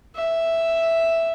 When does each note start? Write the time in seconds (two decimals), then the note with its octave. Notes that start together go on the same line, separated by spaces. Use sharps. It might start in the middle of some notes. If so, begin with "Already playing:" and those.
0.15 E5